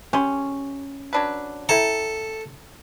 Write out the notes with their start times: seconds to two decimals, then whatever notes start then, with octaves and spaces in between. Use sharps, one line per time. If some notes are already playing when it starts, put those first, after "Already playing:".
0.13 C#4 G4 G#5 C6
1.13 F#3 D4 B4
1.69 E4 A4 G5 A#5